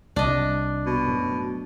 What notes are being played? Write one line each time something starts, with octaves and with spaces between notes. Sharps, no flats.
C2 D4 D#5
B2
F#2 A2